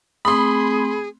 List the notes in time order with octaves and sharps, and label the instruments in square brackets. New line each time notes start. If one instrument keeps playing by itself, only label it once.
[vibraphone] A3 C4 [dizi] G#4 [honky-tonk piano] B5 C6 [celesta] D#6